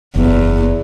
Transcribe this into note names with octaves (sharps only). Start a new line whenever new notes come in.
F#1 E2